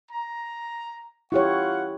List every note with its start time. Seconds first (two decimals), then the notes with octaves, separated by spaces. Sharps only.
0.11 A#5
1.32 E4 F4 G4 C#5 F#5 C#6